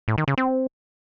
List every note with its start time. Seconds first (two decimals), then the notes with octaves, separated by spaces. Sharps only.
0.08 A2
0.18 D#3
0.28 C#3
0.38 C4